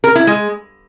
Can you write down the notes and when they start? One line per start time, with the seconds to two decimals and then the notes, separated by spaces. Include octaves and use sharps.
0.04 A#4
0.15 E4
0.27 G#3